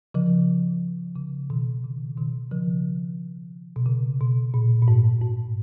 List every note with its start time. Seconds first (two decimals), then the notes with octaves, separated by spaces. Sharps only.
0.14 C#3 F3
1.16 C#3
1.50 B2 D#3
1.84 C#3
2.17 B2 D#3
2.51 C#3 F3
3.76 B2
3.86 C#3
4.21 B2
4.54 A#2
4.82 A#2
4.88 G#2
5.22 G#2